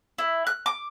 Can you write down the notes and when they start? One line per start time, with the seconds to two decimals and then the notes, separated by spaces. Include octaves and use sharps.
0.18 E4
0.47 F#6
0.66 D6